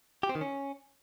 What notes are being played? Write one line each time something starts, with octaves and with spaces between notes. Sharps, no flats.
G4
C4
D#3
C#4